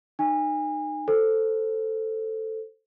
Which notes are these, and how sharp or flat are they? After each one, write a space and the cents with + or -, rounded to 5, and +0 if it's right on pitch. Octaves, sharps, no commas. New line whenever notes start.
D#4 -30 G#5 -30
A4 +5 C5 +0